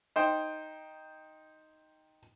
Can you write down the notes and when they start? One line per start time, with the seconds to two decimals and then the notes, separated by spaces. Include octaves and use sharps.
0.16 D#4 C5 G5